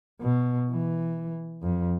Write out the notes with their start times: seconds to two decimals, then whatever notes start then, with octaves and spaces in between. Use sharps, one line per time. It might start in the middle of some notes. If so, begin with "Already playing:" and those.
0.21 B2
0.71 E3
1.62 F2